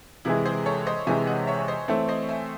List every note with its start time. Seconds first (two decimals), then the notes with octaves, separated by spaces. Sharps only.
0.25 C3 E3 G#3 E4 G#4
0.45 G#4 C5
0.66 A4 C#5
0.87 C5 D#5
1.07 C3 E3 G#3 E5 G#5
1.27 D#5 F#5
1.47 C#5 E5
1.59 C#5
1.68 C5 D#5
1.88 E3 A3 C4 A4 C#5
2.08 C5 D#5
2.29 E5 G#5